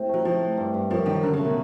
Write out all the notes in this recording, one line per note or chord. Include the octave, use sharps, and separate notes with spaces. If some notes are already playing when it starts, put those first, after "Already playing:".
Already playing: A2 C3
F#3 A3
F3 A3
A3
G2
G2
F#2 F3
F#2 D#3
D3 A#4
C#3
A3
B2